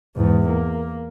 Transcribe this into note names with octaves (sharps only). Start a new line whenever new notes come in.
E2 G#2
A#3